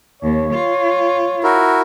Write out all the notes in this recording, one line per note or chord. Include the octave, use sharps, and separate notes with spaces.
D#2 C#5
F4
E4 F#4 A#4